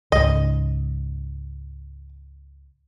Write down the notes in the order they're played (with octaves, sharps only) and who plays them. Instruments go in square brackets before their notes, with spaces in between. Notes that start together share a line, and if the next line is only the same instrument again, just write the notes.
[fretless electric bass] C#2 G#2 [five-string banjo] D#5